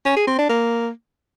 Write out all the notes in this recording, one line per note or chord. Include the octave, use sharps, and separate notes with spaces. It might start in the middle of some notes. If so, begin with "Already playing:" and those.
C#4
G#4
C4
D4
A#3